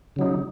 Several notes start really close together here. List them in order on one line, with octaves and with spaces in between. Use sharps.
C#3 F#3 D#4